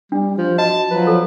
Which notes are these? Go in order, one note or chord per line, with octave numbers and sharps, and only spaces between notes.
G3 D4
F3
F#4 D#5 A5
F3 F#3 B4
A4